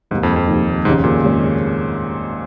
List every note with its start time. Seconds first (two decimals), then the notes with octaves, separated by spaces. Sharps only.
0.11 F1 D#2 G#2 D#3 A#3 D#4
0.23 F2
0.36 F2
0.48 F1 D#2 D#3 A#3 D#4
0.85 F1 D#2 G#2 C#3 G#3 C#4
1.04 A#2
1.23 F1 D#2 C#3 G#3 C#4